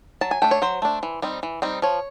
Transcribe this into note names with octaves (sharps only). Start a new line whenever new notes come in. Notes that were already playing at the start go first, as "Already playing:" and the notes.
F#3 A5
G#5
A3 D4 G5
C#5
F#3 C5
A3 D4
E3
G3 C4 D#4
E3
G3 C4 D#4
F3 C#5